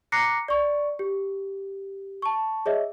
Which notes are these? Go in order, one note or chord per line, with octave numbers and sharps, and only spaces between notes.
A#5 D6 F#6 A#6 C7 C#7
D5 C#6
G4
A5 C#6
G#4 C#5 D#5 E5